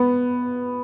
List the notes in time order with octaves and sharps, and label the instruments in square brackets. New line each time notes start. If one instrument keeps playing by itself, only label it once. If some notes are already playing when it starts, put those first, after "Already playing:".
Already playing: [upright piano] B3